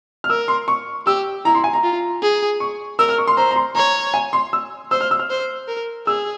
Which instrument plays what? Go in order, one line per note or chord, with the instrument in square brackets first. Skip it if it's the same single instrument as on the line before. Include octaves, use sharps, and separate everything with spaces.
[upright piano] F6
[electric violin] A#4 [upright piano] E6
[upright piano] C6
C#6
[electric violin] G4 [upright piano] E6
[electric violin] E4 [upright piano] A#5
[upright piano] C6
G#5
A#5
[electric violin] F4
G#4
[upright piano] C#6
[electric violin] A#4 [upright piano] E6
[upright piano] F6
C#6
C6
[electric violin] C5 [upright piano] A#5
[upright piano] A#5
C6
[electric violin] C#5 [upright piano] A#5
[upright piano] G#5
C6
E6
[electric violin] C5 [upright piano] E6
[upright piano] F6
E6
F6
[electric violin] C5
A#4
[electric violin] G#4 [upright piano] E6